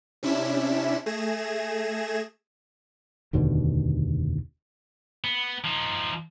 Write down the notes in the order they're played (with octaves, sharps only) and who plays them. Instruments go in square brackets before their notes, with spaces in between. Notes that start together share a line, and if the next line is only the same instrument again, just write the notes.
[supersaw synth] C3 C#4 D4 E4 B6 E7
A3 G#4 G#6 A#6 E7
[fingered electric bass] F1 D#2 B2 D3
[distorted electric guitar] B3
F3 D#4